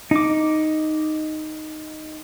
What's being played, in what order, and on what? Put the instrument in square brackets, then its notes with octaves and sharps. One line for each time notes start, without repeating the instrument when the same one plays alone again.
[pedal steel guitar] D#4 D6